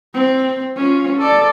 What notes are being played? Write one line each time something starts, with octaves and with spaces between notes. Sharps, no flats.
C4
C#4 F4
A4 D5